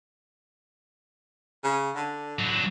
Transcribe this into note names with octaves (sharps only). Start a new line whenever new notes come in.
C#3
D3
F#3 D4